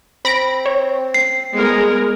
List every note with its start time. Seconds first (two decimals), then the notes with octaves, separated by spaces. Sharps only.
0.25 C4 B5 A#6 D7
0.66 C#5
1.14 C7
1.54 G#3 B3 A#4